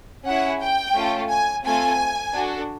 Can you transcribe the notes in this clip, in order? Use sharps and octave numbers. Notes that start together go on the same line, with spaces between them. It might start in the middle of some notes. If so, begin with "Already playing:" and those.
C#4 E4 G#4 F#5
G5
A3 C#4 F4 A4
G#5
A3 C4 F4 A4 G#5
D4 F#4 A4